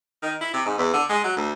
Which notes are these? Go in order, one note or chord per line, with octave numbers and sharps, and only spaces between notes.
D#3
E4
C3
G#2
E2
D3
G#3
F#3
D2